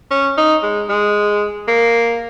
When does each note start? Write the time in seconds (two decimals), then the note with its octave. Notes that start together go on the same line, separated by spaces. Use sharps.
0.11 C#4
0.37 D#4
0.63 G#3
0.89 G#3
1.68 A#3